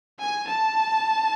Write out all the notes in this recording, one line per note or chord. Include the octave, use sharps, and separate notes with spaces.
G#5
A5